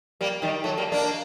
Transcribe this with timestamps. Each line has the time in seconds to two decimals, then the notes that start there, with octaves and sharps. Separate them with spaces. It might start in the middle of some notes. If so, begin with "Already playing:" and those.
0.21 G3 A#3
0.42 D#3 G3
0.64 F#3 A3
0.77 G3 A#3
0.92 A#3 D4